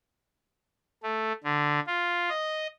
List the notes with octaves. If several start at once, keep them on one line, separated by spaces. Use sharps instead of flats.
A3
D3
F4
D#5